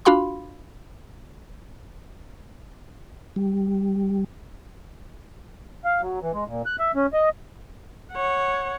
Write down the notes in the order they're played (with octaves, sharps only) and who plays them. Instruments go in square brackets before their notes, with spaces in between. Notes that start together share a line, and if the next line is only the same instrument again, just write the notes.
[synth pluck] D4 F4 F#4 F5 B5 C6
[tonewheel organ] G3
[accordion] F5
F#3
E3
G#3
A#2
F#6
E5
C#4
D#5
[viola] C#5 F#5